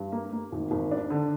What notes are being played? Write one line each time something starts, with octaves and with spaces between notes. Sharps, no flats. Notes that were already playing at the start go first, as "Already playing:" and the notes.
Already playing: G2
A#3
A#3
G#1
G#1
D4
D3